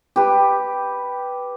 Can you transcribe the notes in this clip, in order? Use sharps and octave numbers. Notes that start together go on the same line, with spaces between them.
G4 B4